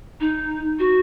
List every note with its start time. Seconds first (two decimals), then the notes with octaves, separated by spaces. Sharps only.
0.20 D#4
0.79 F#4